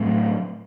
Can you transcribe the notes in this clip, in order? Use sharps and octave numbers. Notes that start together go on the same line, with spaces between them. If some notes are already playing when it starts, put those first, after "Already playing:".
Already playing: A2 F#3 A3 C4